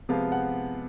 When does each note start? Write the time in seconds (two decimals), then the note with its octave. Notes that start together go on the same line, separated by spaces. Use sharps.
0.09 C3 F3 G#3 B3 F5
0.32 F#5